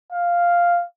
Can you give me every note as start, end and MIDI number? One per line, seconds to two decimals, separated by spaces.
0.13 0.83 77